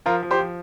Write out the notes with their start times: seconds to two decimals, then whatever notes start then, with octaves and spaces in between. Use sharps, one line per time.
0.06 F3 F4 A#4
0.23 F3
0.31 G4 C5
0.39 F3